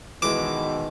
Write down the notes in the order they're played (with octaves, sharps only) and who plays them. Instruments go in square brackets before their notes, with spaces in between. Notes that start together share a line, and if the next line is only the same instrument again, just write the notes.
[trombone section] B2 D#3 [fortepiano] E3 G#3 [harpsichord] D6